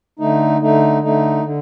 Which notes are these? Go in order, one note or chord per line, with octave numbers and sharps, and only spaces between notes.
D3 A3 D#4
D3 A3 D#4
D3 A3 D#4
D3